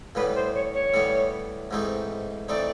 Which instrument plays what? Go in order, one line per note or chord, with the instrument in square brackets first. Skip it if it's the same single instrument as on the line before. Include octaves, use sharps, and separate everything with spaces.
[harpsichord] A2 E3 G3 B3 [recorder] B4
[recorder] C5
C#5
C#5
[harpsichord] A2 E3 G3 B3
G#2 E3 A3 C4 D#4
[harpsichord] E3 A3 C4 D#4 [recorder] D5